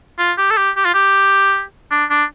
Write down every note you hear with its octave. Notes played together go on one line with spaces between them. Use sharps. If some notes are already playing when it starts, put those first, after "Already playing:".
F4
G4
A4
G4
G4
F4
G4
D4
D4